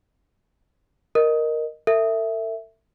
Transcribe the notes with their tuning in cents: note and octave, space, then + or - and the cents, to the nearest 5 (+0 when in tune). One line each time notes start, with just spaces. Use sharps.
A#4 +0 D#5 -10
A4 +45 E5 +0